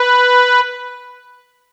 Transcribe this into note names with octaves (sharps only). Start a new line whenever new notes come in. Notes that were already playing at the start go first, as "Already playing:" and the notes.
Already playing: B4